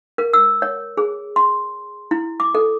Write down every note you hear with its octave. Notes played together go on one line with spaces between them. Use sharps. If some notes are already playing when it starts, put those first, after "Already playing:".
A#4
E6
C#5
G#4
C6
E4
D6
A4